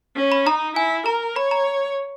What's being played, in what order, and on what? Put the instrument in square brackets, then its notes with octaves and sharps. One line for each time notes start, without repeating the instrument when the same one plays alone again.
[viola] C#4
[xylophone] B5
[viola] D#4 [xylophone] A#5
[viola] E4 [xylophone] G#5
[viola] A#4 [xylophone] A#5
[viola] C#5 [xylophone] B5
[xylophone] A#5